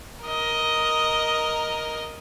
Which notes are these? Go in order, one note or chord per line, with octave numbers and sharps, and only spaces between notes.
A#4 D#5